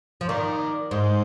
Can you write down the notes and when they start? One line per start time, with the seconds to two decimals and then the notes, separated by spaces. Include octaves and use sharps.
0.21 F3
0.28 D#3 A#4 D5
0.91 G#2 C5 D#5